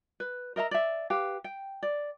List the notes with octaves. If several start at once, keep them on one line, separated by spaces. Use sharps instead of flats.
B4
A#4 D#5 E5 A#5
D5 E5
G4 B4 F5
G5
D5